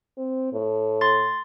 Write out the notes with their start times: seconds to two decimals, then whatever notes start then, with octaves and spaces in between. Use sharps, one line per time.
0.17 C4
0.53 A2
1.01 C6 A6